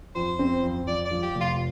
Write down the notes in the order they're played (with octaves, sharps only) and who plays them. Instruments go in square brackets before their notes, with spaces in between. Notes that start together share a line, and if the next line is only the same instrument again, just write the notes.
[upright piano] F2 [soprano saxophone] C5
[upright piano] C4
F2
[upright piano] F2 [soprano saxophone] D5
[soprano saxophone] D5
[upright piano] F3
[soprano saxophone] G4
[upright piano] F1
[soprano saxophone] F4